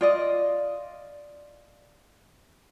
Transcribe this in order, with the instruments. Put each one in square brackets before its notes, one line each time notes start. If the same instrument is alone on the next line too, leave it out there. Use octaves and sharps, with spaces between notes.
[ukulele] F4 D5 D#5